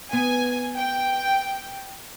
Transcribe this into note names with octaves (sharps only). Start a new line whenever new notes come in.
B3 G#5
G5